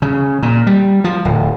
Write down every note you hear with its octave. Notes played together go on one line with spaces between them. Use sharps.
C#3
A#2
G3
F3
D1